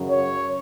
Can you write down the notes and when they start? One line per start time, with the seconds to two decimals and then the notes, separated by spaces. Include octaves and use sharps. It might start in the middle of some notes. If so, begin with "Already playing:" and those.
Already playing: F#2 C#3 F#3
0.10 C#5